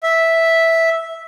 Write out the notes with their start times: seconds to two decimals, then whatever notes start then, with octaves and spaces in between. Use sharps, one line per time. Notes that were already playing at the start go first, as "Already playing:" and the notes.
0.03 E5